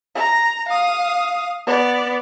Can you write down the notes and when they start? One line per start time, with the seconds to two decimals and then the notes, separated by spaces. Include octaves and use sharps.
0.15 A#5
0.69 F5 D#6
1.67 B3 D5